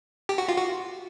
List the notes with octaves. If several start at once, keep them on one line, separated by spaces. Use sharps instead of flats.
G4
F#4
F4
F#4